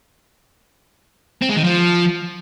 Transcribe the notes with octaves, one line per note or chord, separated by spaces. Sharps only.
C4
G#3
D#3
F3